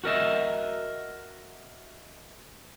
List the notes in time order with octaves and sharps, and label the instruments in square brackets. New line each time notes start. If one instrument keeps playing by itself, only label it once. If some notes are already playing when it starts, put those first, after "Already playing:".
[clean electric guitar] F#4 A#4 D#5 E5